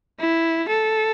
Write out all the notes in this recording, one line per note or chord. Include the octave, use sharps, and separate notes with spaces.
E4
A4